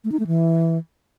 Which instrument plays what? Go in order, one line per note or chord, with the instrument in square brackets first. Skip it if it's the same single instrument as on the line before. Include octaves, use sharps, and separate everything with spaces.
[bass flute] A3
D#4
A3
E3